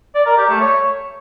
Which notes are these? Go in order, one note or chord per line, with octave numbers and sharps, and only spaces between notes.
D5
A#4
G4
A3
C#5